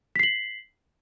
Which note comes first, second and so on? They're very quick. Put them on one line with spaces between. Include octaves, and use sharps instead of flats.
B6 C7 F#7